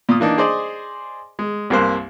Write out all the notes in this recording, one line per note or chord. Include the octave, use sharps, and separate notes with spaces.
A#2 F4 D#6
E3 A#3 D4 D#4
G#4 C5 D5 D#5
G#3
C2 G2 A#3 A#4 C5 F#6